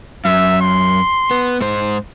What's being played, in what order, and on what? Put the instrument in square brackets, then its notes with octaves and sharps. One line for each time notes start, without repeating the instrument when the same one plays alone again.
[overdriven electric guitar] F#2 [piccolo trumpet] E5
[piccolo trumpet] C6
[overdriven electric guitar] B3
G#2 C5